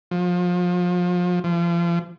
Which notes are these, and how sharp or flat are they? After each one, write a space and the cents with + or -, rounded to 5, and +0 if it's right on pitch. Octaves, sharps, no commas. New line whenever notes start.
F3 +30
F3 -35